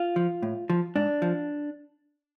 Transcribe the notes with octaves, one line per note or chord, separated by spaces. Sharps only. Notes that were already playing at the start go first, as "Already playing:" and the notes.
Already playing: F4
F3
A2
F3
G#2 D4
F3